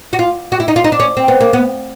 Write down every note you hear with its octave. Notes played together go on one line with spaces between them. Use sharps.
F#4
F4
F#4
E4
D#4
F4
D#4
D4
C#4
C4
B3
A#3
B3